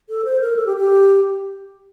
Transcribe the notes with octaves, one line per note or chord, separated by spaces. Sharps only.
A4
C5
A#4
A4
G4
G4